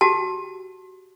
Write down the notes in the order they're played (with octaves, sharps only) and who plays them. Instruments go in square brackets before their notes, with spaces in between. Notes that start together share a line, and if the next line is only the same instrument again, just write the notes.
[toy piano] F#4 G4 A5